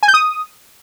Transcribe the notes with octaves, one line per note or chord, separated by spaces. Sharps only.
G#5
G6
D#6